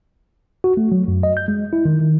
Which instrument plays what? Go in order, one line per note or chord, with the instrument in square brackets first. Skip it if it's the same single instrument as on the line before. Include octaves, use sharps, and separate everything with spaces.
[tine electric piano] F#4
A3
F#3
F#2
D#5
G6
G#3
E4
D#3
D#3